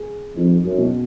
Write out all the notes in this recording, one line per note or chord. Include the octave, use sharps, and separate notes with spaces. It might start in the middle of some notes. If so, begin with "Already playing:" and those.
Already playing: G#4
F2 D#4
F#2
B2